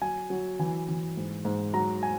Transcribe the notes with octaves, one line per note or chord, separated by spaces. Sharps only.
F#3 G#5
F#3
E3 G#5
E3
G#2
G#2
F#3 A#5
G#5